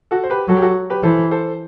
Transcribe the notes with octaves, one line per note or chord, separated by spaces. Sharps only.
F#4 A4
C5
G4 B4
F#3 F#4 A4
G4
F#4 A4
G4 B4
E3 A4 C5
A4 C5